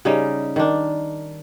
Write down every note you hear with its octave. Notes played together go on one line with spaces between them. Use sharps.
C#3 G3 C#4 D#4
D#3 D4